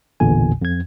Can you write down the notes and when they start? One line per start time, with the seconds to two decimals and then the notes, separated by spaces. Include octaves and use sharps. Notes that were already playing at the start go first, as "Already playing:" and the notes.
0.20 A1 E2 A#2 D3 G#5
0.62 F2 G#6